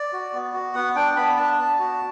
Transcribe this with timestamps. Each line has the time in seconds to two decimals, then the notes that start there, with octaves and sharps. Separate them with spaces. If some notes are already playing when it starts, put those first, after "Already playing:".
Already playing: D5
0.13 F#4
0.33 B3
0.53 F#4
0.74 B3 F#5
0.96 D4 G5
1.16 B3 B5
1.37 D4 A5
1.58 B3
1.79 F#4